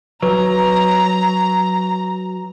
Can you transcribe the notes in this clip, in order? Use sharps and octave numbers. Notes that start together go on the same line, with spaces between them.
F#3 B4 A#5